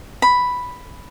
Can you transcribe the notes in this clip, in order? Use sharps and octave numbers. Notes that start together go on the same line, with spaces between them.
B5